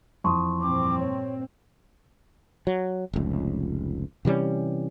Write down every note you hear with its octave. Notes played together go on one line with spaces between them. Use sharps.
F2 E3 A5 C6 C#6 D#6
G2 A#2 C4 D6
C#5
F#3
F1 C#2
C3 E3 G3 C#4